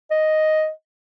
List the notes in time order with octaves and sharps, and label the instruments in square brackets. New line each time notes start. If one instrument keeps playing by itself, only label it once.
[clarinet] D#5